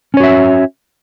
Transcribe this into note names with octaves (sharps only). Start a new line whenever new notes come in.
C#4 F#4 C#5 E5